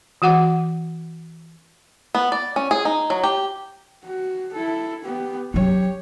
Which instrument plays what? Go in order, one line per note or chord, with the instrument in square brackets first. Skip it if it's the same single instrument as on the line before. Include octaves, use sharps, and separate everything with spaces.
[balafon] E3 F#4 F#5 D6
[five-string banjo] B3
D5
C#4
G#4
D#4
F#3
G4
[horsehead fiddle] F#4
E4 A4
B3 G4
[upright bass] F#3 C#4 [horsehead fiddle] G4 C#5